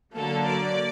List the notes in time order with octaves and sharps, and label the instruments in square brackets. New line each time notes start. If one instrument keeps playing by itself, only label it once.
[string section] D3 F#3 A#3 A4
D5